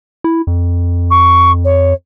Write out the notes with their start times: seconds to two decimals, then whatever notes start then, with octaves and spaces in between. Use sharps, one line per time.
0.24 E4
0.47 F2
1.10 C#6
1.64 C#5